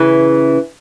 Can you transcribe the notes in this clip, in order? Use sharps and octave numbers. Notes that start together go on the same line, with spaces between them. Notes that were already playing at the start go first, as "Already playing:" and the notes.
Already playing: C#3 E3